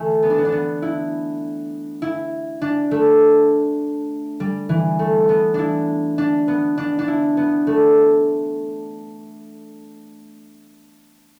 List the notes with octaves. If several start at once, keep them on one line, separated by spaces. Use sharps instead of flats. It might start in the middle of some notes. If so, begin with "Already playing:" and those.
Already playing: E3 A3
B3
D4
B3
D4
B3
E4
E4
D4
A3
G3
E3
A3
B3
D4 E4
D4
B3
D4
D4
E4
B3
A3